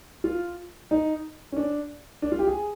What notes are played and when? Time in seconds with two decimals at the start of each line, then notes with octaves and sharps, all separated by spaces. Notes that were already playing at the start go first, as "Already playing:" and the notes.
0.24 F4
0.91 D#4
1.52 C#4
1.57 D4
2.22 D4
2.32 F4
2.39 G4
2.47 G#4